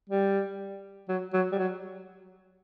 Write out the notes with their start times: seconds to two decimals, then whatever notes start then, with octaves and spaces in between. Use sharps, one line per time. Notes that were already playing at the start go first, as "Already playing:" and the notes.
0.10 G3
1.09 F#3
1.34 F#3
1.52 G3
1.59 F#3